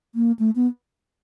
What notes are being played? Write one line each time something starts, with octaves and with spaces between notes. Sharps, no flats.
A#3
A3
B3